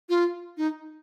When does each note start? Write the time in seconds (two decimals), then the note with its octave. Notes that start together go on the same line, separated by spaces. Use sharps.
0.09 F4
0.57 D#4